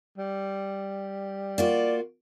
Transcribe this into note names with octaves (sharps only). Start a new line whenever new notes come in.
G3
A#3 F4 F#4 D5